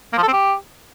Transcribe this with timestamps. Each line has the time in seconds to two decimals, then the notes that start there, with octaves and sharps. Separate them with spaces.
0.13 A#3
0.18 F3
0.23 A4
0.28 C4
0.33 G4